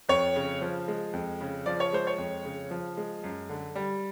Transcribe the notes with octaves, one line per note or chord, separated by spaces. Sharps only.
F2 C#5
C#3
F3
G#3
F2
C#3
F3 D5
C#5
G#3 C5
C#5
F2
C#3
F3
G#3
F#2
D3
G3